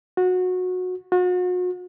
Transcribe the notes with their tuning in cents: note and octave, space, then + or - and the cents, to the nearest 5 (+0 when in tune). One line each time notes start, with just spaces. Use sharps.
F#4 -20
F#4 -40